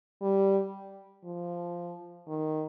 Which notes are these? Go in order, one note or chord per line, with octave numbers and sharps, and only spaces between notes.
G3
F3
D#3